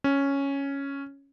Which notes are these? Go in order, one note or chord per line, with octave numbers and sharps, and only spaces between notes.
C#4